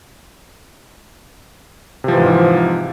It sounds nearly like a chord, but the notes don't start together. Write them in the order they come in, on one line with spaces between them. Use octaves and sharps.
C3 F3 E3 G#2